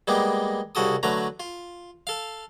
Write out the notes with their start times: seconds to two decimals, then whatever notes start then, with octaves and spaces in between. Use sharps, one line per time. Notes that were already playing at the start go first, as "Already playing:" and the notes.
0.08 G3 G#3 A#3 B3 G4
0.75 C2 C#3 F#4 A4 D#6
1.03 D3 F#3 A3 B4 A#5
1.40 F4
2.07 A4 F5